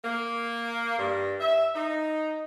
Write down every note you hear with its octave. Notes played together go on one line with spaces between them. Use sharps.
A#3
G2
E5
D#4